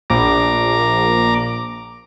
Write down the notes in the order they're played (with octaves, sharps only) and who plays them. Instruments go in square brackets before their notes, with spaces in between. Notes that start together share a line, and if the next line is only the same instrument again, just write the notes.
[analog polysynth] A#1 [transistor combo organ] A#5 D6